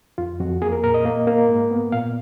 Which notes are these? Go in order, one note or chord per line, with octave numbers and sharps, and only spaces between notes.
F2 F4
F2 F#4
A#3 G#4
A#4
A#2 A#4
D#5
A#3
A#3
G#2
B3
A#2 F5